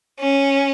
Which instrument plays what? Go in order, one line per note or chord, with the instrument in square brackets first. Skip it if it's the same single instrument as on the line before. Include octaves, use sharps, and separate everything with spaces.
[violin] C#4